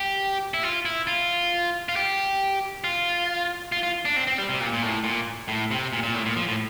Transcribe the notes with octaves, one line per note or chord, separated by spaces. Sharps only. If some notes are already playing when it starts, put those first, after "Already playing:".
Already playing: G4
E4
F4
E4
F4
F4
G4
F4
F4
F4
D4
C4
C4
G3
C3
A#2
A#2
A2
A#2
A2
C3
A#2
A#2
A2
A#2
F3
A2